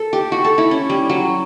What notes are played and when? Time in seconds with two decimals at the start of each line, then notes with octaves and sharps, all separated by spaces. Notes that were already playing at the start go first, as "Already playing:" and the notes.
Already playing: A4
0.13 G4
0.32 F#4
0.45 A4
0.58 E4
0.71 C#4
0.90 G3
1.10 F#3